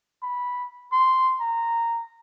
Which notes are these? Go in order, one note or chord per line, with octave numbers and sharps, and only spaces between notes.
B5
C6
A#5